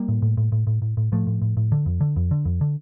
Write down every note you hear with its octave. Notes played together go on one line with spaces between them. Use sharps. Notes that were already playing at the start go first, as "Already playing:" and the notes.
Already playing: G3 A#3
A2
A2
A2
A2
A2
A2
A2
A2 F3 A3
A2
A2
A2
D3
F2
D3
F2
D3
F2
D3